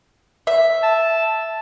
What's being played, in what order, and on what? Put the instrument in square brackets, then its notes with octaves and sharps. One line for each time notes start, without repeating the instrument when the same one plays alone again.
[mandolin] E5
[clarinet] A5